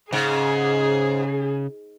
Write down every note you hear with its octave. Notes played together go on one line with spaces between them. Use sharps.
G#2 C#3 G#4